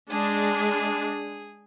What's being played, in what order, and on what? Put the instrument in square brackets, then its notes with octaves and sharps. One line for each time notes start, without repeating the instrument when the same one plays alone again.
[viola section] G#3 D4 [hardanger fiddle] G#4